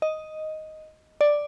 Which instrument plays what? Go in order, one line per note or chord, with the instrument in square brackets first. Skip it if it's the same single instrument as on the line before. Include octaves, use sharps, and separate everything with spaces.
[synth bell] D#5
D5